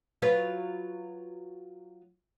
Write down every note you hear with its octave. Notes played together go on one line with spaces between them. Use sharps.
F#3 F4 B4